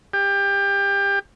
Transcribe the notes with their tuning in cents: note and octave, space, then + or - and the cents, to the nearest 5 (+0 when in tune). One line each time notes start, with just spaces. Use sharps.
G4 +25